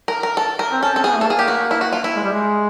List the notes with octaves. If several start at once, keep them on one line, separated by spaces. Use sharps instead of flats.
A#4
A#4
A4
A#4
C4
C#4 A4
C4
A4
B3 G#4
A3
A4
A#3 G#4
G4
F#4
E4
F#4
F4
E4
G#3
G3
G#3